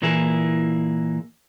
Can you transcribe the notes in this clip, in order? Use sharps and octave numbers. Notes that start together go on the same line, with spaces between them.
A#2 E3 A#3 E4 G#4